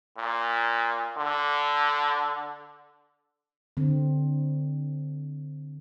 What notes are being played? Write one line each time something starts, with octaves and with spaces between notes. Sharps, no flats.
A#2
D3
D3 C4